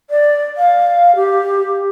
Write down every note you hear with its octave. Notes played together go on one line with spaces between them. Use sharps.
D5
F5
G4